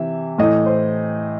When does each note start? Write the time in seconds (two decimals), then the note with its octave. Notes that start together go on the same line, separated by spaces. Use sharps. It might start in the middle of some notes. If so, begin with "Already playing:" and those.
Already playing: C3 E3 E5
0.38 A2 E3 D#5
0.66 C5